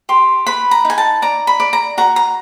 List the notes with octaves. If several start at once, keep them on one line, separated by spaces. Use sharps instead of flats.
G4 C6
B4 B5
A#5
D#4
G#5
A5
D5 A#5
B5
D5
A#5
F#4 A#5
A#5